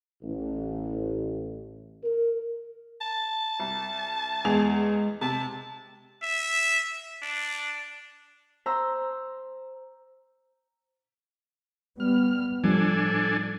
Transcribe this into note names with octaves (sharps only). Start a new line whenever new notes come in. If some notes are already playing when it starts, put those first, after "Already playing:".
A1
A#4
A5
C2
E2 G#3 G#4 F7
C3 A5
E5
D4
C5 A#5 C6 E6
G3 B3 F6
A2 F3 G3 D4 A4 G#5